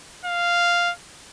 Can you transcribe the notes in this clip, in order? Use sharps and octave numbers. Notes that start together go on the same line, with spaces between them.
F5